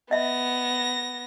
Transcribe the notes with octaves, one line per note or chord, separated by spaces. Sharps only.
B3 D#5 E5 A#6